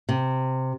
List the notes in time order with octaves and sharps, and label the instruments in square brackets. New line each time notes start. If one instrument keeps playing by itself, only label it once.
[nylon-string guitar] C3